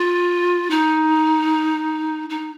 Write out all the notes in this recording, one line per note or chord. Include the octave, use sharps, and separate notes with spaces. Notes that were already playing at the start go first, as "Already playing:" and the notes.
Already playing: F4
D#4
D#4